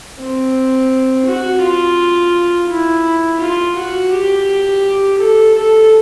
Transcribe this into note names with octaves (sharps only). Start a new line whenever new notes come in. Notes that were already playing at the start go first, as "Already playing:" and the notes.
C4
F#4
F4
E4
F4
F#4
G4
A4
A4